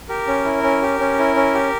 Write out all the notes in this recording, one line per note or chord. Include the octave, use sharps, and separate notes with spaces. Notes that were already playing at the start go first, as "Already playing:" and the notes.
G4 A#4
C#4
E4
C#4
G4
C#4
E4
C#4
G4